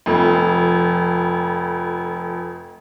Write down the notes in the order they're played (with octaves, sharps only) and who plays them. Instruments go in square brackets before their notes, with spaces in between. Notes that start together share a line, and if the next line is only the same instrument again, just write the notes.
[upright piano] F1 F2